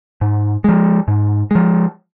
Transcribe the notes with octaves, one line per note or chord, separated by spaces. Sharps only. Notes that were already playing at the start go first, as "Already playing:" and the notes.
G#2
F3 G#3
G#2
F3 G#3